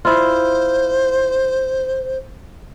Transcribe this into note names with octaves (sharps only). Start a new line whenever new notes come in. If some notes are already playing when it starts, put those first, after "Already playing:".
E4 F4 C5